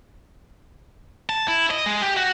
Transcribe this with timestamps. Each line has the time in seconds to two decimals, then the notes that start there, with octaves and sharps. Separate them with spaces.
1.30 A5
1.48 E4
1.71 D#5
1.86 G#3
2.02 G4
2.17 F#4